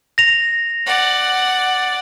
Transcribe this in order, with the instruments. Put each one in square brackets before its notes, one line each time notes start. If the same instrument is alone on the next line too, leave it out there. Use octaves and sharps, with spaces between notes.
[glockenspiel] A#6 F7
[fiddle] D5 F#5